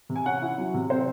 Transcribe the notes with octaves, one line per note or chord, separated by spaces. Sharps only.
C3
G#5
C#4 F#5
E4
F#3
C3
C4 C5